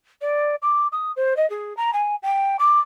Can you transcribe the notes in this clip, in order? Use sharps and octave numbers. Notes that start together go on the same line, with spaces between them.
D5
D6
D#6
C5
D#5
G#4
A#5
G#5
G5
D6